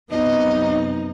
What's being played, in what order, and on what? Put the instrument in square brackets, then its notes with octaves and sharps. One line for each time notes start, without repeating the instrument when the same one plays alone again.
[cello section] F#2 C3 [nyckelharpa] B3 [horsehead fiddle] D#4 [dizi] D#5